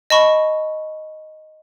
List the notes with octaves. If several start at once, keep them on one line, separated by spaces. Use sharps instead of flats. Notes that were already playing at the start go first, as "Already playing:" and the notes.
D#5 A5 B5 C#6